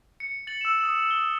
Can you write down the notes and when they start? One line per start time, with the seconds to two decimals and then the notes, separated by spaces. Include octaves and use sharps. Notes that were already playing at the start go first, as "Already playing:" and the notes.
0.20 C#7
0.47 A6 F#7
0.61 E6 E7
0.84 D#6
1.11 G7